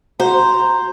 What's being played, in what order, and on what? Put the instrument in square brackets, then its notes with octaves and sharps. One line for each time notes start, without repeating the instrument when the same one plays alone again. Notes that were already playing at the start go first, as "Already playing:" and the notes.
[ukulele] F#4 [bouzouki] C5 [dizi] A#5